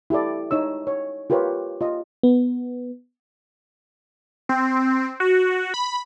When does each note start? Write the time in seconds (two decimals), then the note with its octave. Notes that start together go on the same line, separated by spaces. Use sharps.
0.10 E4 G4 A4 D5
0.51 D#4 C#5 E6
0.87 C#5
1.30 F4 G4 A#4 B4 C#5
1.81 F4 D#5
2.23 B3
4.49 C4
5.20 F#4
5.74 B5